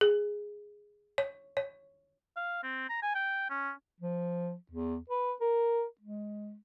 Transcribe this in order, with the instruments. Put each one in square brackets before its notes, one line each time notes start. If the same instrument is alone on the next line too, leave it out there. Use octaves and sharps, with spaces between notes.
[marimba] G#4
C#5
C#5
[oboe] F5
C4
A#5
G#5
G5
C#4
[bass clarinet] F3
E2
B4
A#4
G#3